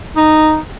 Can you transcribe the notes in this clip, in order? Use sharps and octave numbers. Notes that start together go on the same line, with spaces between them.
D#4